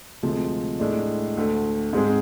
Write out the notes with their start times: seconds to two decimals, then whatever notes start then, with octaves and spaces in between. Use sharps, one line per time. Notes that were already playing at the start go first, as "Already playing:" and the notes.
0.23 D2 C3 F3 G#3
0.80 A2 G#3 D4
1.37 D2 D3 A3
1.93 G#2 G#3 C4 G#4